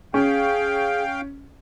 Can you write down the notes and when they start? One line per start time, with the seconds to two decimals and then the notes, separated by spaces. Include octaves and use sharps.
0.14 C#4 G#4 F5 G5